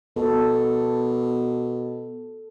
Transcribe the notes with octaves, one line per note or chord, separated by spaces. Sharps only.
B2 A4